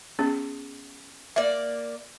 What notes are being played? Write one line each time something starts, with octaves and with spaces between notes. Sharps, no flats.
B3 C#4 G#4
A#3 D5 E5